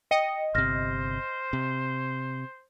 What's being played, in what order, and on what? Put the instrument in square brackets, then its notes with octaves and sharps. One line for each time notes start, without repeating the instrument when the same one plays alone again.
[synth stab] D#5 [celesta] G5 C#7
[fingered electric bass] G1 C3 [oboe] C5 [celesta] F6 A#6
[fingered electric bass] C3